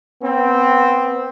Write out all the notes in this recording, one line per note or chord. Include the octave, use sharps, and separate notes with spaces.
B3 C4